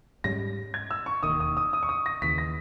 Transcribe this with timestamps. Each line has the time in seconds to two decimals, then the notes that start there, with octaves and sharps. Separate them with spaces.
0.24 G#2 G3 C#4 A#6
0.74 G#6
0.91 E6
1.06 C#6
1.23 E1 D#2 D#3 D#6
1.40 D#6
1.57 D#6
1.73 D#6
1.83 C#6
1.89 D#6
2.06 A#6
2.22 D#2 C#3 E3 B6
2.38 A#6